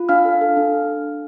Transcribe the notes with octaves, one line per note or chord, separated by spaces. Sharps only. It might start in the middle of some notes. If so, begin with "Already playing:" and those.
Already playing: F4
D4 F5 F6
A4
A4
D4